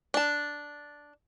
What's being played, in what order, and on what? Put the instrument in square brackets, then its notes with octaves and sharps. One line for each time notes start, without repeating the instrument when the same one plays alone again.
[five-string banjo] D4 A5